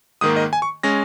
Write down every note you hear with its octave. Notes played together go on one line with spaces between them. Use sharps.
G#2 D#3 A#3 D#6
D#5
G#5
C#6
G#3 C#4 A#6